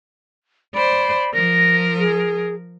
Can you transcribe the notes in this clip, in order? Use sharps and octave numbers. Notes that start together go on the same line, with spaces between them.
C5 D5 B5
F3 A#4 A#6
G#4